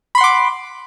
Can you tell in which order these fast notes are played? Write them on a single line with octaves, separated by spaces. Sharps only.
B5 C6 F#5 D6